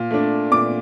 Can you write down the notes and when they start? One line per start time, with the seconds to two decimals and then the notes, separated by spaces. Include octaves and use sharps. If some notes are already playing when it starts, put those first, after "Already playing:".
Already playing: A#2
0.11 A3 D4
0.52 A#2 D6